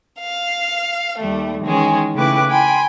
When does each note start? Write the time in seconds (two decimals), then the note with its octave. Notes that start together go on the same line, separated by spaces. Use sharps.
0.19 F5
1.18 D#2 G3 A3
1.63 D#3 E3 G#3 C#4 G#4
2.14 C#3 A3 E4 B4 G5 D6
2.50 G5 G#5 B5 C6